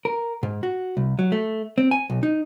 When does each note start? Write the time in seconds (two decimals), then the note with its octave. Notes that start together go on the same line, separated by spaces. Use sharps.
0.05 A#4
0.43 G#2
0.63 F#4
0.97 C2
1.19 F#3
1.32 A3
1.78 C4
1.91 G#5
2.10 B1
2.23 D#4